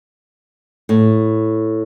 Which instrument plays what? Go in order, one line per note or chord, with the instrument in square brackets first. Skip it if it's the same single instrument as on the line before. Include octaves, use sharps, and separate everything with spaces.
[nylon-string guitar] A2